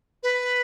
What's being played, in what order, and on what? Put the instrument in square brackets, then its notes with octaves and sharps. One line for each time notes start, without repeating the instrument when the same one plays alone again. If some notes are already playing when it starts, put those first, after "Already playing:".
[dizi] B4